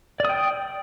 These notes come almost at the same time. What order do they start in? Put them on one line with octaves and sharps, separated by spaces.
D5 D#6 G5